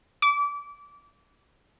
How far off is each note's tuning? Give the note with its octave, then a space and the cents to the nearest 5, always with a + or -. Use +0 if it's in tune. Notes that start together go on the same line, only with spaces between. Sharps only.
D6 -25